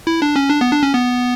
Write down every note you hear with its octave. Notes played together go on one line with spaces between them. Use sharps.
E4
D4
C#4
D4
B3
D4
C#4
B3